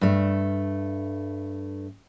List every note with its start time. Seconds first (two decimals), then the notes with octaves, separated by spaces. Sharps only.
0.01 G2 A3